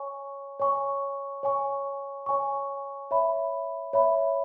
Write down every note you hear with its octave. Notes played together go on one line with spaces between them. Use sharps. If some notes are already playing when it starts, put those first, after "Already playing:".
Already playing: C#5 G#5 C#6
C#5 G#5 C#6
C#5 G#5 C#6
C#5 G#5 C#6
C#5 E5 B5
C#5 E5 B5